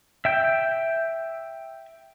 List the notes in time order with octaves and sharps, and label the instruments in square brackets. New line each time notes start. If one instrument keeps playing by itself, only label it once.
[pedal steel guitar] E5 G5 G6